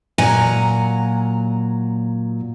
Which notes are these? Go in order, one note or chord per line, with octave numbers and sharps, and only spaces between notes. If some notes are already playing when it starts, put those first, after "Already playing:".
A#2 F#3 F#5 G#5 A#5